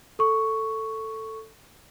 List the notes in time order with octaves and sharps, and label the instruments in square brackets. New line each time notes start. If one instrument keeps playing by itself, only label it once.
[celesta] A4 C#6